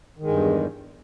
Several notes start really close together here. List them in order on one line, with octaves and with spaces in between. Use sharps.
D#3 G#3 G2 E2